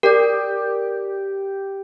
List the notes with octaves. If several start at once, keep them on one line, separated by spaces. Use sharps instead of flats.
G4 A#4 D5